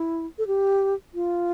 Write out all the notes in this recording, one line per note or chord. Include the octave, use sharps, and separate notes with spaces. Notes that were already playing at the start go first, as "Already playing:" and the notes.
Already playing: E4
A4
G4
F4